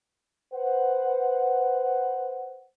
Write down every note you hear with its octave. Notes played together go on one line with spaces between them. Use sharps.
B4 C5 F#5